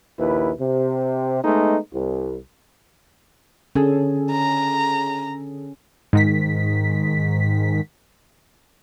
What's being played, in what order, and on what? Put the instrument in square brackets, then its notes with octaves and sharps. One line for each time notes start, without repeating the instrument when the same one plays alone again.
[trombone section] A#1 D#2 E4 B4
C3
G#3 A3 B3 D#4
C2
[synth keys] D3 G#4 A4 [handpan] C#4
[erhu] A#5
[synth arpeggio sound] G#2 D#3 B6